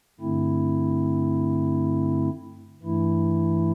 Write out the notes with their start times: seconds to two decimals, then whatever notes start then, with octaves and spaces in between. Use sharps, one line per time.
0.20 G2 D3 A3 C4 E4
2.82 G2 E3 A3 E4